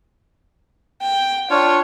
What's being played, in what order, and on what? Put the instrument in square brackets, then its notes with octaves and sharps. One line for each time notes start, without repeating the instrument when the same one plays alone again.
[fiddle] G5
[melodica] D4 F4 [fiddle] C#5